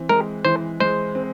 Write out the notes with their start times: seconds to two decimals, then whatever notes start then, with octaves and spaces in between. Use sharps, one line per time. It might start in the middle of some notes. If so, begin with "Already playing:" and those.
Already playing: E3 C4
0.09 G#3 A#4
0.45 E3 C5
0.80 G#3 C5
1.15 C4